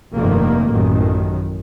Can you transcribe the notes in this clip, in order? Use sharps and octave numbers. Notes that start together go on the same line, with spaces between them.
F1 G2 D#3 A3 A#3
A1 F#2 A2 D#3